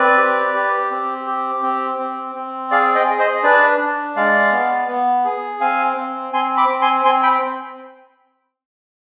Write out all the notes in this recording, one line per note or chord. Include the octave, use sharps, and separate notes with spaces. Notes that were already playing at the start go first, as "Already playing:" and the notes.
Already playing: C4 B4 D5
G4
G4
C4
G4
C4
C4
C4
G#4 D5 F5
D#5 G5
G#4
C5 D#5
D4 B4 D5
D4
G#3 D5 F5
B3
B3
G#4
C4 F5 G#5
C4
C4 G#5 C6
B5 D6
C4
G#5 C6
C4 G#5 C6
G5 B5